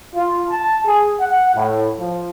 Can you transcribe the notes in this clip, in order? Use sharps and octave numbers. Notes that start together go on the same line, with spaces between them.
F4
A5
G#4
F#5
A2
F3